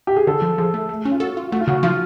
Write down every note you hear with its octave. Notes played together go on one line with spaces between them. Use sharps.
G4
G#4
D3 A4
F3
F3 G#4
A3
A3
C#4
F4
F#4 A4
F4
A3 F#4
F4
C#3 F#4
F3 F4